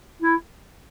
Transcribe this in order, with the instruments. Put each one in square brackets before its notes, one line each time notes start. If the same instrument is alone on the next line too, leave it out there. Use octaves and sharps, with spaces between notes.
[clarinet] E4